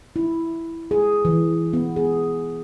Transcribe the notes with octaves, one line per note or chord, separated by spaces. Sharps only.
E4
G#4
E3
B3
G#4